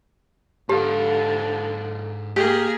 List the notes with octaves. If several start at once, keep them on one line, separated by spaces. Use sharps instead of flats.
G#2 D3 G4 F5
A#3 G4 G#4